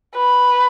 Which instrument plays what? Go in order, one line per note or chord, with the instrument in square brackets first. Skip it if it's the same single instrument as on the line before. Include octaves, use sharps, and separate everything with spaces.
[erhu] B4